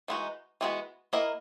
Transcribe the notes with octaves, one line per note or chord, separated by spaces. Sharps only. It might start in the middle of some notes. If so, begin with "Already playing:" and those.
E3 G#3 B3 D#4 F#4
E3 G#3 B3 D#4 F#4
A#3 E4 A#4 D#5